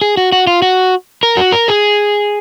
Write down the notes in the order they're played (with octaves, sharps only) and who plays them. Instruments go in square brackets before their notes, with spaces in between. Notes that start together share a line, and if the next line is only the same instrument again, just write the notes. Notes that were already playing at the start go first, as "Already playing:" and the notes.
[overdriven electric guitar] G#4
F#4
F#4
F4
F#4
A#4
F#4
A#4
G#4